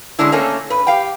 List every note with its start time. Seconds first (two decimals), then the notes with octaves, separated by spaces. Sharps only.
0.19 D3 G#3 C#4 D4 E4
0.32 A3 A#3 C#4 A4
0.70 G2 B4
0.87 G4 F5 G5